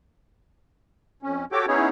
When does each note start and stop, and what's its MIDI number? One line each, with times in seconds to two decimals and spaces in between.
1.23 1.45 41
1.23 1.45 61
1.52 1.66 66
1.52 1.66 67
1.52 1.66 69
1.52 1.66 73
1.52 1.66 79
1.52 1.66 86
1.67 1.89 59
1.67 1.89 61
1.67 1.89 63
1.67 1.89 64
1.67 1.89 68
1.67 1.89 73